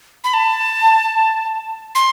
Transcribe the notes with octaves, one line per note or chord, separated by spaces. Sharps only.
B5
A5
C6